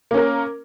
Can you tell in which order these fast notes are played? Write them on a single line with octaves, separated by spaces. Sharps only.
A#3 C#4 A#4